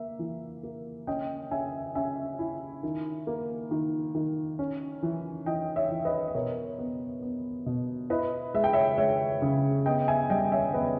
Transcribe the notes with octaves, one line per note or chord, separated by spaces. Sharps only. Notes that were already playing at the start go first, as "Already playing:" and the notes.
Already playing: A#3 E5
E3
A#3
C#4 D#5 G5
C#4 E5 G#5
C#4 E5 G#5
E4
D#3
A#3
D#3
D#3
C#4
E3
E3 D#5 G5
C#5 E5
E3
B4 D#5
D#5
B2 A#4 C#5
B3
B3
B2
E4 B4 D#5
G#3 E5
G5
C#5 E5
G#3 C#5 E5
C#3
B3 D#5 G5
E5 G#5
G3 D#5 G5
C#5 E5
B3 B4 D#5